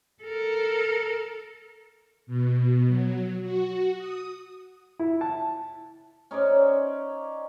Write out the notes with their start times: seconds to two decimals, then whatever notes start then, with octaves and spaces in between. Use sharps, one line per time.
0.23 A4 A#4
2.27 B2
2.88 F#3
3.43 F#4
3.98 D#6
4.99 E4
5.21 A5
6.31 C#4 D#4 C5 D5